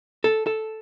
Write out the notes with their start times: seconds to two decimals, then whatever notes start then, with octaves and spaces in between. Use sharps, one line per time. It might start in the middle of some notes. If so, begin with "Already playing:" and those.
0.24 A4
0.47 A4